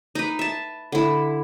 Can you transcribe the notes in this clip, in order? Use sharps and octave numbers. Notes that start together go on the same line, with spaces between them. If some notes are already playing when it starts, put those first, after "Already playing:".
D#4 B4
E5 A5
D3 E4